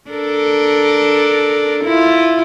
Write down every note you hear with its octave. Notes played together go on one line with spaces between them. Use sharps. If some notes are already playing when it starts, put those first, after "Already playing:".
D4 A4 A#4
E4 F4